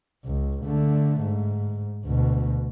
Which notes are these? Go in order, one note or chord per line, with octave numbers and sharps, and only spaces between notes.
C#2
D3 A3
G#2
D2 B2